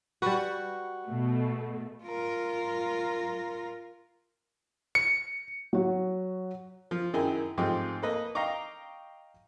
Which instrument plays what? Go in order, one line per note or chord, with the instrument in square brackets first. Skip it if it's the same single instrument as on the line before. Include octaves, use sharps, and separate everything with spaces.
[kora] G3 B4 [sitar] F#4
[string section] B2 A3
[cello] F4 A#4
[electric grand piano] C#7
[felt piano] F#3 F#4
[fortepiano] F3
F#2 D#3 E4 G#4 G5 G#5
G#2 F3 A3 C4 G4
A#3 A4 B4 D#5
D#5 F5 G5 A#5 C#6 D6